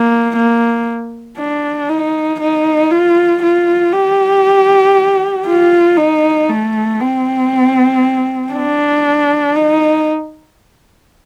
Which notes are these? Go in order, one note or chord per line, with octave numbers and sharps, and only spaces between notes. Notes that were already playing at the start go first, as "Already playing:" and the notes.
Already playing: A#3
A#3
D4
D#4
D#4
F4
F4
G4
F4
D#4
A3
C4
D4
D#4